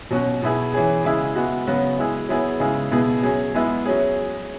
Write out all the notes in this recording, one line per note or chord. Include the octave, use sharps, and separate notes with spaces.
B2 F#3 C#4 F#4
B2 B3 E4 G#4
E3 C#4 G#4
C#3 G#3 E4 G#4
G#3 B3 F#4
C#3 F#3 B3 F#4
G#3 E4 G#4
F#3 B3 E4 G#4
C#3 G#3 E4 G#4
B2 B3 E4 G#4
F#3 C#4 G#4
G#3 B3 E4
F#3 C#4 G#4